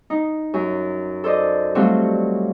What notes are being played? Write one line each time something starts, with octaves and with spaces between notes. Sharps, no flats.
D#4
F#2
A4 C5 D5 D#5
F#3 G3 A3 C4 F4 F#4